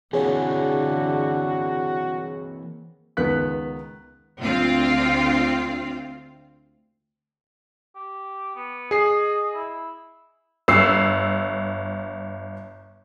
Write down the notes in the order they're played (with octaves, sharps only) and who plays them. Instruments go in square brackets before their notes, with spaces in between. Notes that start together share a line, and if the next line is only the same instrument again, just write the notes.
[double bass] D3 [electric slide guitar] E3 A#3 C4 [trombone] F#4 [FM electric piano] G#4 C#5
[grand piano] C#2 D#3 B3 F#6 B6
[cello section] D2 C4 F4 F5
[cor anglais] G4
B3
[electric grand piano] G#4 C7 [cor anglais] D#5
[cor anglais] E4
[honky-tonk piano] G1 E6 C7